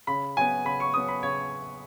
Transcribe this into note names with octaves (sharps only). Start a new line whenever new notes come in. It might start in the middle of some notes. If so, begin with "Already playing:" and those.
C#3 B5
F#3 B3 G#5
C#3 B5
C#6
F#3 B3 D#6
B5
C#3 C#5